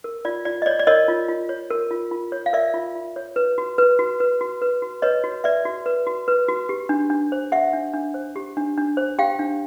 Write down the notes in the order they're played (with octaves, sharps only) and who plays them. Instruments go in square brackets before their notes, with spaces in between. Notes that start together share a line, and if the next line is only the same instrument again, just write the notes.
[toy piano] A#4
F4 D5
F4 D5
D#5
C#5 D5
D5
A#4 C#5 D#5
F4
F4
C#5
A#4
F4
F4
C#5
F5
A#4 D5 E5
F4
F4
C#5
B4
F#4
B4
F#4
B4
F#4
B4
F#4
B4 C#5 D#5
F#4
B4 D5 E5
F#4
B4
F#4
B4
F#4
G4
D4
D4
C5
G4 E5 F#5
D4
D4
C5
G4
D4
D4
C5
G4 F5 G5
D4